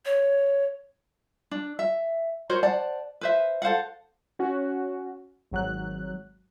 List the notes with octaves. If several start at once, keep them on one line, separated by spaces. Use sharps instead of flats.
C#5
D4
E5
F#4 A#4 C5 C#5
C5 D5 F#5 A5
B4 C5 E5
A4 C5 F5 F#5
C#4 F#4
G#1 F#3 F#6